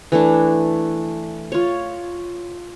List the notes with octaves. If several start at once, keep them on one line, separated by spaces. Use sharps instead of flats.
E3 A3 D4
F4 C#5